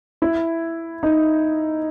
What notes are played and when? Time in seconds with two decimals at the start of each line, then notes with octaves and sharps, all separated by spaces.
0.22 E4
1.03 D#4